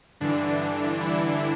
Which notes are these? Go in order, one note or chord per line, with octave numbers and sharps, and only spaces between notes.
G2 D3 E3 D4
D3 D4
E3 E4